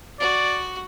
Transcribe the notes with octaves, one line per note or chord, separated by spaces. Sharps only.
F#4 D5